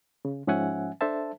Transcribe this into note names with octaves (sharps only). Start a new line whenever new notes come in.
C#3
G#2 F3 C#4 E5 F#5 G#5
D4 A4 C5 E5 A5